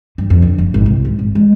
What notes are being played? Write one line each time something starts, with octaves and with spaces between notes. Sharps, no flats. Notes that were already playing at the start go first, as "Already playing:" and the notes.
G2
F2
D3
F#1
G#1
C2
G#2
G#1
G#3